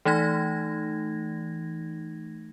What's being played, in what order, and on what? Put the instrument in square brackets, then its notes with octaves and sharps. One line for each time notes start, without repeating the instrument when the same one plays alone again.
[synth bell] E3 A3 D#4 G#6 A#6